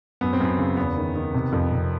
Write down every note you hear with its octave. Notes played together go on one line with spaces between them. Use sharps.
F#2 B3
C4
F#2 B3
C#3
E2 B3
D#3
D#3
C3
F2
C3